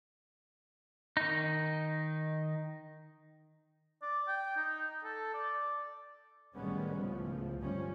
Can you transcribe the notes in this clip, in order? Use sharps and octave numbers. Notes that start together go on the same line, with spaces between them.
D#3 D#4
D5
G5
D#4
A4
D5
A1 D#3 G3 G#3 B3 C#4
C#2 A2 F3
G1 F3 G3 C#4